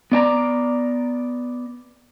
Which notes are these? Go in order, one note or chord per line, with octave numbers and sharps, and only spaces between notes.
B3 D5 A5 A#5